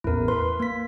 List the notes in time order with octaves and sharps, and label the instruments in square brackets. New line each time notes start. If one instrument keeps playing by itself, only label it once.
[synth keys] A1 E2 [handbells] E4 A#4
[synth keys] B4 [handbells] C6
[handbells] A#3 B6